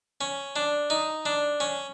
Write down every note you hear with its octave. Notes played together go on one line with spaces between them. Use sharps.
C#4
D4
D#4
D4
C#4